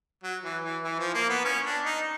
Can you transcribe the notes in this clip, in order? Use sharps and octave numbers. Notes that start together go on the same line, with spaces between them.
F#3
E3
E3
E3
F3
A#3
B3
C#4
D4
D#4